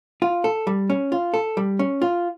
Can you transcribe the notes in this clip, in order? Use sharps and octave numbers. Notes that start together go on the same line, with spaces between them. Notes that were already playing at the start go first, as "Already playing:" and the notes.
F4
A4
G3
C#4
F4
A4
G3
C#4
F4